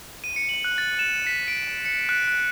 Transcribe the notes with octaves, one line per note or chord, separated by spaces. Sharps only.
D#7
C#7
F#7
F#6
A6
E7
B6
D7
C#7
F#6
F#6